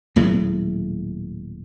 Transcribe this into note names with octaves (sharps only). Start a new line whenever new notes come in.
D#1 A2 F#3 G#3